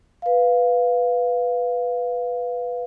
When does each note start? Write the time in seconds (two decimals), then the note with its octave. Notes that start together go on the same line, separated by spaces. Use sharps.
0.22 B4 F5